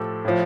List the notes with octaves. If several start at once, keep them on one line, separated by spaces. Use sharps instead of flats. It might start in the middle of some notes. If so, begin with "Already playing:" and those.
Already playing: A2 F3 G4 A4
A2 F3